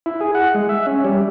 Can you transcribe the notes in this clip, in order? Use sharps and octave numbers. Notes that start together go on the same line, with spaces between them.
E4
G#4
F#5
G#3
E5
C#4
G3